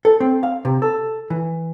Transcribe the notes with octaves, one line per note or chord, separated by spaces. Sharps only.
A4
C4
F5
C3
A4
E3